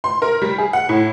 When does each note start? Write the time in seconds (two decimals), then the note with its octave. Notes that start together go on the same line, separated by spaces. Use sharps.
0.04 C6
0.22 A#4
0.42 G3
0.58 G#4
0.73 F#5
0.89 A2